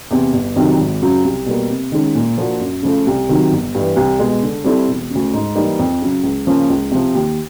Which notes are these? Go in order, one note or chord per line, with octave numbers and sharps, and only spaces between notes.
E2 C3
G1
F2 C3 D#3 F#3
G#1
F#2 C#3 F#3
C2
B2 G3 A#3
C3
D#3 G#3 C#4
A#2
F3 A#3 D4 F#4
F#2
C#3 F3 A3
C2
C3 D#3 F#3
G1
G2 E3
C2
B2 G#3
D3
G3 C4 E4 A4
E1
D2 C#3
G#2
E3 G3 A#3 D#4
F2
C#3 F#3
C#2
C#3 F3 A#3 C#4
C#2
C3 F3
D#2